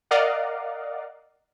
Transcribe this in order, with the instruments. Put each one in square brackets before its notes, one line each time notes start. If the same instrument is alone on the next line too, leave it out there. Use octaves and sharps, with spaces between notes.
[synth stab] A#4 D5 D#5 F5 F#5